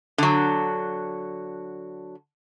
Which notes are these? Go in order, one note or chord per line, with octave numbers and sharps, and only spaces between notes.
D3 F#3